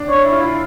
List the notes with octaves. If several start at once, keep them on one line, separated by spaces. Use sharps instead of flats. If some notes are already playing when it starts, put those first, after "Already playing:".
Already playing: D4
C#5
E4
F4
E4